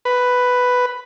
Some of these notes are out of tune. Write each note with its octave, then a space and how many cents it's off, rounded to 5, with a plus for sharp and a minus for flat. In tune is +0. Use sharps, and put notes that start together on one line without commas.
B4 +5